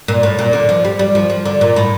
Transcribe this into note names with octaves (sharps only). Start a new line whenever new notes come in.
A#2
A2
A#2
D3
F3
G3
G3
F3
F3
D3
A#2
A2